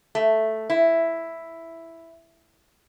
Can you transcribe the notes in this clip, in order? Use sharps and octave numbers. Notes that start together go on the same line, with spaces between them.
A3
E4